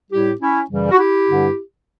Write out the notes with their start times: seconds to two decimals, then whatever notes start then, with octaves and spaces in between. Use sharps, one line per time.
0.11 A2 G3 E4 G4
0.41 C#4 E4
0.69 F#2 C#3 E3 G3
0.92 F#4
0.98 E4 G4
1.28 G2 D3 G3